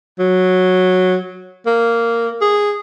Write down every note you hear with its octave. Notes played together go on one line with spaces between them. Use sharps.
F#3
A#3
G#4